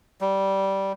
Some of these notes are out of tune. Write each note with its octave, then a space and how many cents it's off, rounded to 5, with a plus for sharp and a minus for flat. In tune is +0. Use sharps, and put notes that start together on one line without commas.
G3 -10